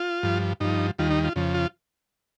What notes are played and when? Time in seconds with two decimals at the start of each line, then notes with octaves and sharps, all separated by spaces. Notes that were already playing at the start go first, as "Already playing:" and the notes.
Already playing: F4
0.23 G2 F3
0.60 G2 F3 D#4
0.99 D#2 D#3 G3 F4
1.11 D#4
1.24 F4
1.36 F2 C#3 F3
1.54 F4